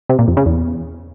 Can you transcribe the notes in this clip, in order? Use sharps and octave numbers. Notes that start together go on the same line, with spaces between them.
C3
A#2
F2
C#3
E2